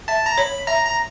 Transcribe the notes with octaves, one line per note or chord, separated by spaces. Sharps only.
E5 A5
A#5
C#5 B5
E5 A#5
A#5